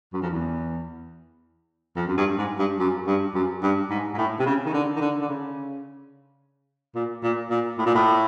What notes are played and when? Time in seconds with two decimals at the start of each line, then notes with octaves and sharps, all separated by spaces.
0.13 F#2
0.22 F2
0.30 E2
1.96 F2
2.07 F#2
2.17 G2
2.38 G#2
2.59 G2
2.79 F#2
3.07 G2
3.34 F#2
3.62 G2
3.90 G#2
4.14 G#2
4.18 A2
4.39 C3
4.46 C#3
4.66 D#3
4.73 D3
4.96 D#3
5.01 D3
5.21 D3
5.28 C#3
6.95 A#2
7.23 A#2
7.50 A#2
7.78 A2
7.86 A#2
7.94 A2